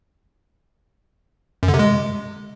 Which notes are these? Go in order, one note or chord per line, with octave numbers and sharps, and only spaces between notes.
F#2
D3
C3
G#3